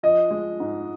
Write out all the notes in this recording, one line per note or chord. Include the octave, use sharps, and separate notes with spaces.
F3 D#5
G#3
G#2